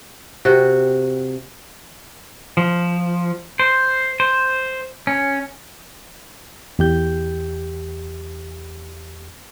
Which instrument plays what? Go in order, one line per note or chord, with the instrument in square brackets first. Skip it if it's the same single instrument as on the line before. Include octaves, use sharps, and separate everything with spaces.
[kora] C3 F#4 G5
[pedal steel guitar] F3
C5
C5
C#4
[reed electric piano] E2 G4 G6